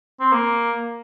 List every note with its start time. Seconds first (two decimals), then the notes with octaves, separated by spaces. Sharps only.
0.20 C4
0.32 A#3